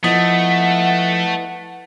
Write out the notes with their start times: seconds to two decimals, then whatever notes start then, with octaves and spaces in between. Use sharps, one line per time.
0.04 F3 A3 B3 E4 D#5 F#5 D#6